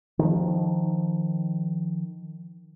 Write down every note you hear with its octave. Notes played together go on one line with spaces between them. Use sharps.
D#3 F3